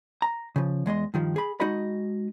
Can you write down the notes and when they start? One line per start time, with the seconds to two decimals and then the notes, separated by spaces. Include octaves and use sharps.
0.22 A#5
0.56 C#3 F3
0.86 E2 G#3 D#5 C6
1.14 G2 D#3 F3
1.36 G#4 B5
1.60 G#3 D#4 F#4 D#5 B5